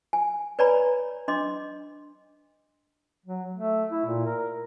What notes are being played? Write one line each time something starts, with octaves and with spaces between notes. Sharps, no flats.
G#5
B4 C#5 D5 G#5 A#5 B5
D4 D#5 C6 D6
F#3
A3
E4
A#2
A#4